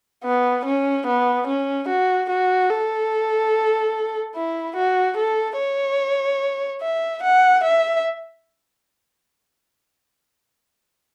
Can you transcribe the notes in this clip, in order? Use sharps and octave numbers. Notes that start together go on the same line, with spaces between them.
B3
C#4
B3
C#4
F#4
F#4
A4
E4
F#4
A4
C#5
E5
F#5
E5